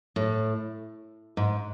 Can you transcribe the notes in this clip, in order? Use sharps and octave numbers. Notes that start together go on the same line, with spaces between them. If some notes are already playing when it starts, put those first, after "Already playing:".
A2
G#2